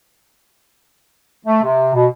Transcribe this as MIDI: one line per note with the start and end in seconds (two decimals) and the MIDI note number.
1.45 1.60 57
1.63 1.94 48
1.94 2.06 47